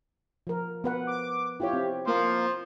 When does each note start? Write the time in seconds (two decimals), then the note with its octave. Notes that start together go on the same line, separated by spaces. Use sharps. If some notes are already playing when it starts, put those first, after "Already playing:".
0.47 F3 A#4
0.84 B3 B4 F#5
1.07 D6
1.60 E4 F4 G4 C#5
1.73 C4
2.07 F3 A#3 C5